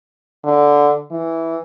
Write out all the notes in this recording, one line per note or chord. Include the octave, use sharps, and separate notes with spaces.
D3
E3